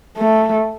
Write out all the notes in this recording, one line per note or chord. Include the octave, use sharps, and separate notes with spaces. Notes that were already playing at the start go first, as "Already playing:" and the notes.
A3